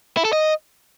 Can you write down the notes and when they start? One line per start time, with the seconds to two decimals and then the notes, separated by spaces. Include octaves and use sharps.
0.17 E4
0.25 A4
0.33 D#5